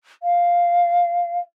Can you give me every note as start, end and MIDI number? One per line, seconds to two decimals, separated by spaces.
0.23 1.38 77